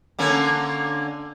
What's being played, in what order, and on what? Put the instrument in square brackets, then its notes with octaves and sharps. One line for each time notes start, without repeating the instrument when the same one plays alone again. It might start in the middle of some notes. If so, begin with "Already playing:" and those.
[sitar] D3 A#3 C#4